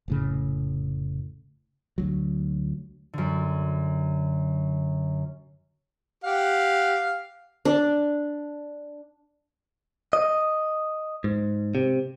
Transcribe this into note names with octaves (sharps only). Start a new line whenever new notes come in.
F1 A2 C#3
D2 F#3
F#2 D3
G4 F5 F#5
D4
D#5
G#2
C3